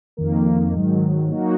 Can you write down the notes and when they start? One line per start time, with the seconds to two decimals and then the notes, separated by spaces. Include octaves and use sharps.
0.17 F2 D#3 A#3
0.73 G#2 D#3 F#3
1.29 F#3 A#3 D#4 F#4